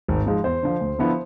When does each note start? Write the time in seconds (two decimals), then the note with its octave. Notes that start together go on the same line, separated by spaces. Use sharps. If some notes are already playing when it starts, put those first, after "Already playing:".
0.08 G#1
0.26 G#2 F3 G#3
0.44 E2 C5
0.63 D3 F3
0.81 D2
0.98 D3 F3 B3 E4